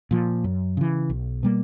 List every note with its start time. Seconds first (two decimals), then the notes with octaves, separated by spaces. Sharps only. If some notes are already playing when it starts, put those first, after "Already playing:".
0.11 A#2 F3
0.44 F#2
0.77 C#3 E3
1.10 B1
1.43 B2 G3 A#3